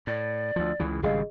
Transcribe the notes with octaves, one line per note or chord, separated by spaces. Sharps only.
A2 D5
D2 F3
C#2 C#3 E3
G#1 C#3 G3 G#4 D#5 F5